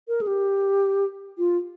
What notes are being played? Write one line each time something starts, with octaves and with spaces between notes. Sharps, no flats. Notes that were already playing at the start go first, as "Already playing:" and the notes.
A#4
G#4
G4
F4